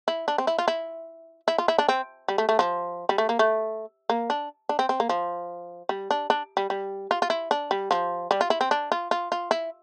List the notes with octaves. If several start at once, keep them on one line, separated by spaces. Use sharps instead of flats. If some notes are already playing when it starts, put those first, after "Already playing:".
E4
D4
C4
E4
F4
E4
E4
F4
E4
D4
C4
G3
A3
A3
F3
G3
A3
A#3
A3
A#3
D4
D4
C4
C4
A#3
F3
G3
D4
D4
G3
G3
F4
F4
E4
D4
G3
F3
G3
F4
E4
C4
D4
F4
F4
F4
E4